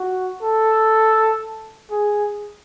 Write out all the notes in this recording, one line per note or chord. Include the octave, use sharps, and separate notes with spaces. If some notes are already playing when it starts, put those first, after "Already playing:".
Already playing: F#4
A4
G#4